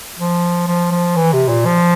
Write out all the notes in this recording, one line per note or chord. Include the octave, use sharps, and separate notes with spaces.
F3
F3
F3
E3
C3
A#2
F3